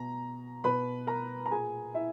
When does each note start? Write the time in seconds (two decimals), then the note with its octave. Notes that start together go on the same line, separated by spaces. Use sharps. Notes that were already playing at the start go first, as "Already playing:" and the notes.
Already playing: B2 A#5
0.64 B2 B4 B5
1.07 A#4 A#5
1.46 A#5
1.50 A#2 G#4 G#5
1.94 E4 E5